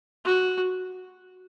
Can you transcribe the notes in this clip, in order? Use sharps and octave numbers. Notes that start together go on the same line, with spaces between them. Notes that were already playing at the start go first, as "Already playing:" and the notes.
F#4